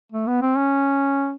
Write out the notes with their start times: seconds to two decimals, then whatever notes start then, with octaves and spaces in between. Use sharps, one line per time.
0.12 A3
0.27 B3
0.42 C4
0.57 C#4